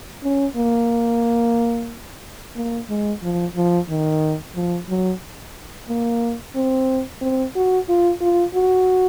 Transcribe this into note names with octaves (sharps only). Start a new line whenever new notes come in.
C#4
A#3
A#3
G#3
F3
F3
D#3
F3
F#3
A#3
C4
C4
F#4
F4
F4
F#4